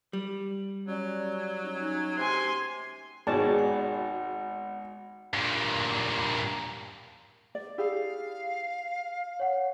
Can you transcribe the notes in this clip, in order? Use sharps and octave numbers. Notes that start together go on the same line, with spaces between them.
G3
F#3 C#4 D5
C#4 D#4
C3 G#5 C6
G#1 B2 G#4 C#5 D5 F#5 G5 A5
F#5 B5
G2 A#2
D5
E4 G4 G#4 F5
C#5 F#5